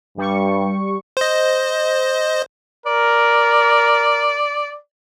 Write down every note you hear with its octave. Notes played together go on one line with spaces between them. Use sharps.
G2 G3 C#6
C5 D#5
A#4 D5